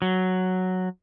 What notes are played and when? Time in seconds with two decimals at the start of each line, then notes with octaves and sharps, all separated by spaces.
0.02 F#3